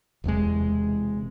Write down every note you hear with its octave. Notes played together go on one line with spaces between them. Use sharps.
E1 E2 C3 G#3